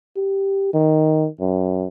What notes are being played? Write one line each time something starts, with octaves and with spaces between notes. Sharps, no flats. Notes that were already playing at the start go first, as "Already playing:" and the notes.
G4
D#3
F#2